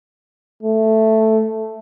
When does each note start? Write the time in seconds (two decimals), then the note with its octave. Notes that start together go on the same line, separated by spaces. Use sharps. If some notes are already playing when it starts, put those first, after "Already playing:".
0.63 A3